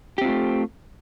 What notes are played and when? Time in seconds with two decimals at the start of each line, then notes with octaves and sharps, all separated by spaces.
0.18 G4
0.21 C4
0.25 F4
0.28 A3